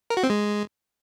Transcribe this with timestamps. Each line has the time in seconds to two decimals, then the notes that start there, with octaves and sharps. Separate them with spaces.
0.10 A#4
0.17 F#4
0.23 C4
0.30 G#3